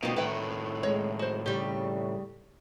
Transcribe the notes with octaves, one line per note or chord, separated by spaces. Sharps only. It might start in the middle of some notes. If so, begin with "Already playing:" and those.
D2 B2 A#3 C4 D#4 F4
A2 D#3 E4 B4 F#5 G5
G#3 C#5
F#4 C5
C#3 G3 G4